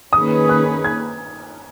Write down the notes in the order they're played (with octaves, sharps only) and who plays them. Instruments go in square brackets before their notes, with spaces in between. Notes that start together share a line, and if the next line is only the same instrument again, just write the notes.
[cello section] D#3 A#3 C#4 G#4 B4 [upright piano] D#6
[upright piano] F#6
G#6